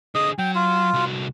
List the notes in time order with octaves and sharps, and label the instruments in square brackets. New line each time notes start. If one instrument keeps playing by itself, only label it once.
[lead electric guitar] D3 G#4 [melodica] D#5 D#6
[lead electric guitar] F#3 [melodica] G5
[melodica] F4
[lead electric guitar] C2 F#4